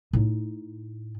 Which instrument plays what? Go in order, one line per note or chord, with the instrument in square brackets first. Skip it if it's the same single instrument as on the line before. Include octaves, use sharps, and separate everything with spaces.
[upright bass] A2 D#4